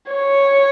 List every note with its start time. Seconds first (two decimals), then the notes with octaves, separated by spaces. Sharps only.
0.12 C#5